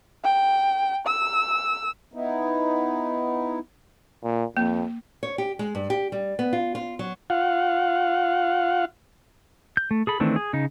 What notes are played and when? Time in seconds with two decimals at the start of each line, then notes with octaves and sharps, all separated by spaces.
0.24 G5
1.07 E6
2.14 B3 D#4 E4
4.23 A#2
4.57 F2 A#3
5.23 C#5
5.38 G4
5.59 G#3
5.75 G2
5.90 G4
6.12 G3
6.39 B3
6.53 F4
6.75 F4
6.99 F#3
7.30 F4 F5 F#5
9.77 G6
9.91 A3
10.07 G#4 A4 B5
10.20 D#3 E3 A3 C4 D4
10.36 G#4
10.53 C#3 D#4